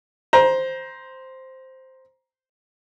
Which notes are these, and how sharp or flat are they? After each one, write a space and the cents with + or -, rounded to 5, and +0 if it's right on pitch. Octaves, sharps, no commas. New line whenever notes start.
C5 +0 A#5 +25